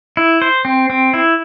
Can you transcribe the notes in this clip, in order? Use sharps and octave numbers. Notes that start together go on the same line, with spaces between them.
E4
C5
C4
C4
E4